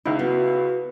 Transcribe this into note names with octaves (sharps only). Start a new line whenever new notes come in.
C#2 D#4 E4
B3 F#4